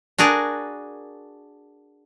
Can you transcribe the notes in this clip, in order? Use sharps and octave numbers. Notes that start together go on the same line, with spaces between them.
D4 F#4 G#4 A#4